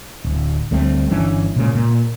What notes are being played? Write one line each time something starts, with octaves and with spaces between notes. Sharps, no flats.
D1
D2 G3 A3 C4
G1 E3 C#4 D4
A#2 C#3 G#3
A#2